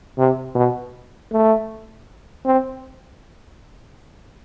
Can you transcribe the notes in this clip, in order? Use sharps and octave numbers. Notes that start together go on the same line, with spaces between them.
C3
B2
A3
C4